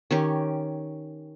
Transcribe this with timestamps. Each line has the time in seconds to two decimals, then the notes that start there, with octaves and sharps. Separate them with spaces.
0.11 D#3 C#4 G4